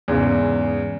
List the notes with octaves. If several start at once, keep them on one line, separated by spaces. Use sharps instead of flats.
E2 G#2 C#3